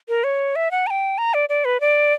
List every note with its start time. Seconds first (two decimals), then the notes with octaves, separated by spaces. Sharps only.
0.09 A#4
0.24 C#5
0.56 E5
0.71 F#5
0.87 A#5
0.90 G5
1.18 A#5
1.34 D5
1.49 D5
1.65 B4
1.81 D5